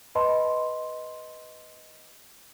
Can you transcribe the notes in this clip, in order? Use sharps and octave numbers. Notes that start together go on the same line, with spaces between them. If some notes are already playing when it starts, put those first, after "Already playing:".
B4 D#5 A5 B5 C6